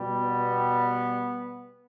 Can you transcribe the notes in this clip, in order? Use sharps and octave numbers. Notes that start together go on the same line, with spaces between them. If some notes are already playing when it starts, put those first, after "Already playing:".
Already playing: B2 G3
B3